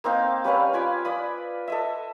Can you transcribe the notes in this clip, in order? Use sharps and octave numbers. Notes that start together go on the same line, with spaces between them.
A#3 C4 D#4 F5
G3 C#4 B4 F5
F4 G#5 B5 D6
D5 B5 D#6
A4 D#5 E5